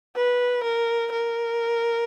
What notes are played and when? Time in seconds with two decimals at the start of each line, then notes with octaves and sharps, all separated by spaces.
0.16 B4
0.64 A#4
1.12 A#4